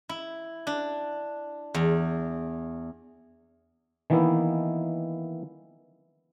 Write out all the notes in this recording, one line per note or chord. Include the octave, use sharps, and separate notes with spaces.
E4
D4
E2
D#3 E3 A#3 B3 D#4 E4